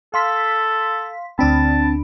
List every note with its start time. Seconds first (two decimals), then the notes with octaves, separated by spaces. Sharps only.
0.14 A4 F5 C6 B6
1.39 D2 C4 D4 A5 B5